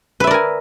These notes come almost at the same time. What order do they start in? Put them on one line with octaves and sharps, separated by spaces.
B4 E5 D5 A#4 G#5